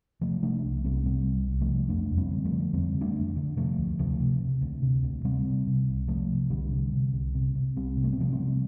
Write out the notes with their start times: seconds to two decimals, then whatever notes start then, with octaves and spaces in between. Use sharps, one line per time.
0.21 C3 F3 A3
0.42 C3 A3 D4
0.64 C2
0.84 C2 G3 C4
1.05 C3 G3 C4
1.26 C2
1.48 C2
1.61 F3 A3
1.69 C3
1.89 F2 A3 D4
2.11 F2
2.17 G3 C4
2.31 D3
2.45 F3 A3
2.52 D3
2.73 F2 G3 C4
2.94 D3
3.01 A3 D4
3.15 F2
3.36 D3
3.57 C3 F3 A3
3.78 D2
3.99 C3 F3 A3
4.20 C3
4.41 C3
4.61 D2
4.82 C3
5.03 D2
5.24 C3 G3 C4
5.45 C3
5.67 C3
5.88 C2
6.08 C3 F3 A3
6.30 C3
6.50 C2 D3 G3
6.71 C3
6.93 C3
7.14 C2
7.35 C3
7.55 C3
7.77 C2 G3 C4
7.97 C3
8.04 A3
8.13 C4
8.18 C3 F3 A3
8.32 G3 C4
8.39 C3